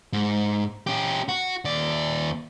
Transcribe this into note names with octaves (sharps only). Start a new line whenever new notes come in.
G#2
C#4 G4
F#4
D#2 D5